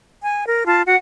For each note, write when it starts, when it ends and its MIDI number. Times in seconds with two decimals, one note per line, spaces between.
0.21 0.44 80
0.46 0.63 70
0.65 0.82 65
0.65 0.82 81
0.86 0.96 66
0.86 0.96 78